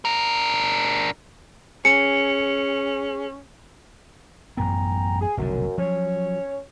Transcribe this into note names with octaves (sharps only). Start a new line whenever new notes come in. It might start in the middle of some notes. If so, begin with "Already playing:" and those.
D4 A#4
C#4 G#4 C#7
A1 F#2 B3 G5 G#5 A#5
G#4
F1 B1 F#2 D3
F3 F#3 C#4 C#5